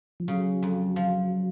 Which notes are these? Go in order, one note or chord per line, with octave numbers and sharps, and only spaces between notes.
F3
C#3 F#3
F2
F3